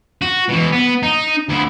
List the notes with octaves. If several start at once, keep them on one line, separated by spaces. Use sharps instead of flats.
F#4
B2 E3
B3
D#4
D2 E4